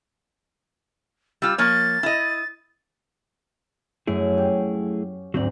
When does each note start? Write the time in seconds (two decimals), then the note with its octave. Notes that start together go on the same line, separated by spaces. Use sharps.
1.42 G3 F4 E6
1.58 F3 A#3 C#5 A6
2.03 E4 D#5
4.07 F#2 A3 E4 G#4
4.38 G4
5.34 D2 G#2 F#3 C4 D5